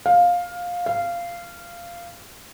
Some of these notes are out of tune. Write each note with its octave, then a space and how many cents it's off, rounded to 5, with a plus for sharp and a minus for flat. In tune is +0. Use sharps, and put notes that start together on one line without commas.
F5 +15
F5 -15